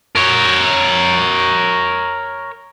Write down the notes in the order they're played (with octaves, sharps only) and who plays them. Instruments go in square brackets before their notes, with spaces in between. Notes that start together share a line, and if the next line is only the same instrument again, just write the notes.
[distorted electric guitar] A#4 C#5